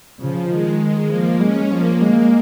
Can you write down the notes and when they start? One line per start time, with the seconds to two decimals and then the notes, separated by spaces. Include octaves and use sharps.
0.19 C#3 F3
0.50 D#3 G#3
1.10 F3 A#3
1.41 G#3 C#4
1.71 F3 A#3
2.01 G#3